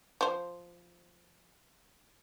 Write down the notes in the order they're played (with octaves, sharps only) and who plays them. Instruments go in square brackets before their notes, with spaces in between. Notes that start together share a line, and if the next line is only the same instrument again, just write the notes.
[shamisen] F3 C5